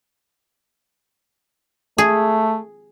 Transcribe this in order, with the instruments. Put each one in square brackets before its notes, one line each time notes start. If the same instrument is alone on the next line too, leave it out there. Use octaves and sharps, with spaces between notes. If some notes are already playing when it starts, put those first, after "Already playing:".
[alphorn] A3 [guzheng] G#4